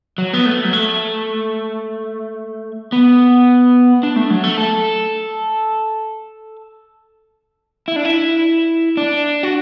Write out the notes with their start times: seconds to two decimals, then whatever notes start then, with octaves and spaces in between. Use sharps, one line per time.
0.18 F#3
0.33 B3
0.46 A3
0.64 F#3
0.73 A3
2.92 B3
4.03 D4
4.16 A3
4.30 F#3
4.44 A3
4.58 A4
7.88 E4
7.96 D4
8.05 E4
8.97 D4
9.43 F#4